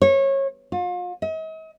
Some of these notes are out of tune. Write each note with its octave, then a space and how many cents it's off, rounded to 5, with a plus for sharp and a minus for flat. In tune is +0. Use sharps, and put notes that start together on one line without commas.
C#5 -25
F4 +40
D#5 +45